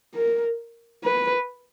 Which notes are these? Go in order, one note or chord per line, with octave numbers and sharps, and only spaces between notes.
A#4
B4